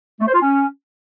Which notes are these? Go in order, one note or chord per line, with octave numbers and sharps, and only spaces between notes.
A3
C5
F4
C#4